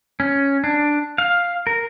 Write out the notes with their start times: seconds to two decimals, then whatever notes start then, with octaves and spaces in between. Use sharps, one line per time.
0.20 C#4
0.64 D4
1.18 F5
1.67 A#4